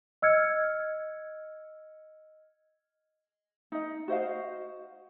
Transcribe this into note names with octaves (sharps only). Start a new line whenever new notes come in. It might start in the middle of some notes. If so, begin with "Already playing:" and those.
D#5 E6 F6 G#6 C#7
D#4 D#5
F#4 C5 D#5 F5